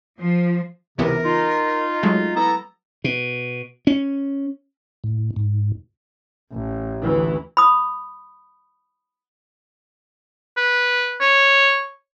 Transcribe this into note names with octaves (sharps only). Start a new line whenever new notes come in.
F3
C#2 C3 E3 B3 A#4
D#4 F4
F#3 G#3 A3
B3 E4 A4 A#5
B2
C#4
A2
G#2
A1
D2 E3
B5 D#6
B4
C#5